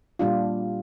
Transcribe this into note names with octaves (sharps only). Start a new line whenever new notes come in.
A#2 G3 D4 F4